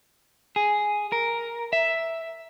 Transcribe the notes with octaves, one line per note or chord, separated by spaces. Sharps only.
G#4
A#4
E5